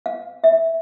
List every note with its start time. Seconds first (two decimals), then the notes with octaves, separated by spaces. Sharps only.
0.06 F5
0.44 E5